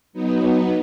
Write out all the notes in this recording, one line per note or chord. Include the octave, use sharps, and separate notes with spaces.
F#3 B3 D#4